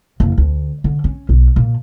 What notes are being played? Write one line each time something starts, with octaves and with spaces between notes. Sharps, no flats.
F#1
D2
D3
C#4
B1
A#2